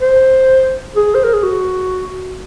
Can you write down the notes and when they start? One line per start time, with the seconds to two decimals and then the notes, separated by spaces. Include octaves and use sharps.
0.01 C5
0.96 G#4
1.15 C5
1.24 A#4
1.33 G#4
1.43 F#4